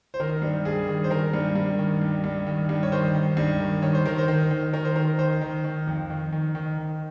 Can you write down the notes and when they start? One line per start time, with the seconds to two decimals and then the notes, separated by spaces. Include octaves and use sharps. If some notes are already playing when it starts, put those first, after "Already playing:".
0.14 C5
0.20 D#3 A#4
0.42 G2
0.65 G2 G#4
0.88 D#3
1.04 C5
1.10 D#3 A#4
1.34 G2
1.56 G2
1.79 D#3
2.02 G2
2.24 G2
2.47 D#3
2.69 G2
2.83 C#5
2.92 D#3 C5
3.15 D#3
3.37 G2
3.60 D#3
3.82 D#3 C#5
3.95 C5
4.06 D#3 A#4
4.18 C5
4.28 D#3
4.51 D#3
4.73 D#3 A#4
4.85 C5
4.96 D#3 A#4
5.19 D#3 C5
5.42 D#3
5.64 D#3
5.87 F2
6.10 D#3
6.33 D#3
6.55 D#3
6.78 D#3